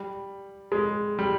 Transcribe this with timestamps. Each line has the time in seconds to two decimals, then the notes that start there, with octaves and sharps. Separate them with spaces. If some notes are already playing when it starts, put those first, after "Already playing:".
Already playing: G3
0.72 G#3
1.19 G3